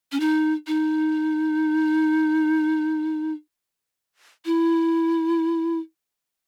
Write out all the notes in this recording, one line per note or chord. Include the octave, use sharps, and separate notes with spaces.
C#4
D#4
D#4
E4